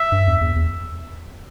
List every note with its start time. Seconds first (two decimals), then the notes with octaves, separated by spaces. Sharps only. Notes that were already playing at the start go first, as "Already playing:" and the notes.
Already playing: E5
0.12 G2
0.27 E2
0.41 E2
0.56 E2